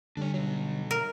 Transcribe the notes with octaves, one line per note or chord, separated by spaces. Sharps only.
D3 G3 D4 C#5
B2 F#3
A#4